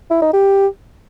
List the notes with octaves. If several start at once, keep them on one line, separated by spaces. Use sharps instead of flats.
E4
D#4
G4